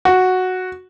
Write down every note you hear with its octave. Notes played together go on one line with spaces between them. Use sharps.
F#4